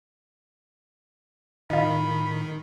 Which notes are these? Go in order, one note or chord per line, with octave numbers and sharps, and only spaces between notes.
A2 D#3 D#4 F4 B5